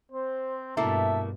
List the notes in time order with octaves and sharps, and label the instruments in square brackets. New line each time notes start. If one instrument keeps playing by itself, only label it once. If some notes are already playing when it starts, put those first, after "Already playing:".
[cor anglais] C4 [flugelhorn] C5
[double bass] G2 B2 [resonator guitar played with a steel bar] A3 A#3 E4 [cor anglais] E5 [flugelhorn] A5